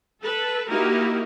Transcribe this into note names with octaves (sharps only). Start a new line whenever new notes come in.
A4 B4
A#3 D#4 E4 F#4 G4 A#4